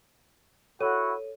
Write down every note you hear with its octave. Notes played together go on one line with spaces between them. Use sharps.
E4 F#4 A4 C#5 D#7